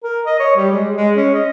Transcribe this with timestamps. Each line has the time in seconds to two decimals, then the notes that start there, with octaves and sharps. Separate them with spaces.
0.04 A#4
0.26 D#5
0.40 C#5
0.57 G3
0.72 G#3
0.96 G#3
1.16 C#4
1.34 D#5